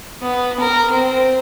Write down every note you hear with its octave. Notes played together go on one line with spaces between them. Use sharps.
B3
A#4
C4